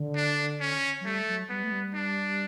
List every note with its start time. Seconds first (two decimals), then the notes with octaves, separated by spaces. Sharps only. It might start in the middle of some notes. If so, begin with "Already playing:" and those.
Already playing: D3
0.16 D4
0.60 C#4
1.01 F#3
1.05 G3 A3
1.27 F#3
1.49 G3 B3
1.63 A3
1.71 G3
1.94 D4